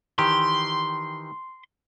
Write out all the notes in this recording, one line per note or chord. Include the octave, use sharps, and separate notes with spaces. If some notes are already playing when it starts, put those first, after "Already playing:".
D#3 E3 G4 C6